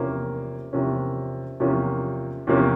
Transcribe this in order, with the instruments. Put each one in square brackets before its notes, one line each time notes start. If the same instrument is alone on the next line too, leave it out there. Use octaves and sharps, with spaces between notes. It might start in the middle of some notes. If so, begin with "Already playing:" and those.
Already playing: [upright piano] E2 C3 F3 A#3 C#4
E2 C3 F3 A#3 C#4
E2 C3 F3 A#3 C#4
E2 C3 F3 A#3 C#4